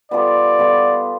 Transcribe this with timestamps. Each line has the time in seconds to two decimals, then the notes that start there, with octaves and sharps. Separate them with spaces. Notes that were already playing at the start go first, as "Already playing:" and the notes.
0.11 G3 B3 F4 A4 D5
0.59 G3 B3 F4 A4